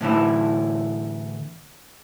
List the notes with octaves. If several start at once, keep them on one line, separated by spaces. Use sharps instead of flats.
A2 D3 E3 E4